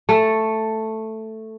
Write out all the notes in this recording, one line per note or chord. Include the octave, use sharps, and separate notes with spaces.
A3 A4